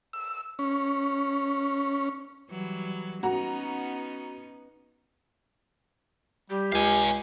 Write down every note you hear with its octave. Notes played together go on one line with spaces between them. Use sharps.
E6
C#4
E3 F#3 G3
B3 C#4 D#4 F#4 A#5
G3 G4
C#2 F5 G#5